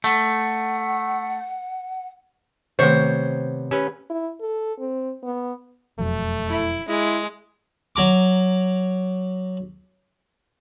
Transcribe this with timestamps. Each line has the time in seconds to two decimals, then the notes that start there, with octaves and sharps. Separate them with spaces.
0.04 A3 F#5
2.79 C3 D#3 A3 B3 C5 C#5 G5
3.71 C#4 G4 B4
4.10 E4
4.40 A4
4.79 C4
5.23 B3
5.99 E1 F2 F#3 A3
6.48 E4
6.89 G#3 E4
7.96 F#3 A#5 D6